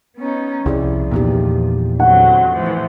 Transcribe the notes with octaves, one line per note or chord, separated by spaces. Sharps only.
B3 C#4 D#4
C2 F3 E4 G#4 D5
E2 A#2 B3 D#4 G4
D3 F#3 C4 F#5
A2 E3 F3